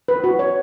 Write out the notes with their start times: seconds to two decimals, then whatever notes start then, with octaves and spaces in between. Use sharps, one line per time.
0.08 B4
0.24 F#4
0.39 C#5